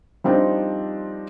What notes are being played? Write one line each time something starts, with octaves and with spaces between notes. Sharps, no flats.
F3 G3 C4 D4 D#4